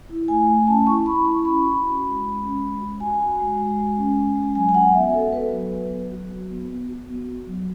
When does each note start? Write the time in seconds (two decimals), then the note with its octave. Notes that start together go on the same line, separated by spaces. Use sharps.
0.09 E4
0.28 A3 G#5
0.47 A3
0.67 C#4 A5
0.87 E4 C#6
1.06 E4 B5
1.25 E4 C#6
1.44 C#4 B5
1.64 F#4
1.84 C#4
2.02 G#3
2.23 G#3
2.42 C#4
2.61 G#3
2.81 F#4
3.00 F#4 G#5
3.19 F#4
3.39 G#3
3.58 G#3
3.78 G#3
3.97 C#4
4.16 C#4
4.35 G#3
4.55 F#3 G#5
4.69 G#5
4.74 F#4 F#5
4.94 B3 E5
5.14 F#4 A4
5.33 B3 B4
5.52 F#3
5.72 B3
5.92 F#3
6.11 F#4
6.30 F#3
6.49 B3
6.69 B3
6.89 F#4
7.09 B3
7.28 F#4
7.46 F#3